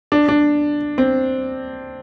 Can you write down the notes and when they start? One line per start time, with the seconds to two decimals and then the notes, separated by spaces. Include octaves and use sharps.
0.12 D4
0.28 D4
0.98 C4